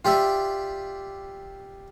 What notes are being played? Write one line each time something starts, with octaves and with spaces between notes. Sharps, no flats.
F4 G4 D5 E5